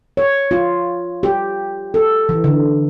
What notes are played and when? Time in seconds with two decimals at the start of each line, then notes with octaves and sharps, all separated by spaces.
0.17 C#5
0.51 F4
1.23 G4
1.94 A4
2.29 E3
2.44 D3